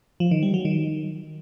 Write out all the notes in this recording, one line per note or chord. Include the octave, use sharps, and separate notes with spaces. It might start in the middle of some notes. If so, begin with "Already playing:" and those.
F3
D#3
G3
F#3
D#3